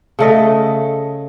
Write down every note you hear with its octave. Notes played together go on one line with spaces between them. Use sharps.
C#3 A3 D#5